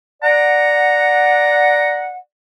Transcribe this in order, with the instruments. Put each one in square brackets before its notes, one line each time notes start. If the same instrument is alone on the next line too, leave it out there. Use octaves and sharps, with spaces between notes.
[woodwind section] D5 F#5 [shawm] A#5